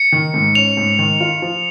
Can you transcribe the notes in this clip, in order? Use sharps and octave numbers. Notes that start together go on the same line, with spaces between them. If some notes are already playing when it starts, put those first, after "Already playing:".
Already playing: C#7
D#3
G#2
C#4 F7
G#2
D#3
F4
F3